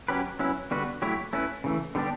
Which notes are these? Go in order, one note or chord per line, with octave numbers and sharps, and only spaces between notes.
F#3 C#4 G4 B4
F#3 C#4 E4 B4
D3 G3 B3 F#4 B4
F#3 A3 E4 G4 C#5
A3 C#4 E4 B4
C#3 E3 A3
D3 G3 B3 D4 G4